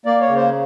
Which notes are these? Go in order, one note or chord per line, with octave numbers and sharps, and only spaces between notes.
A#3 D5
C#5
C#3
C5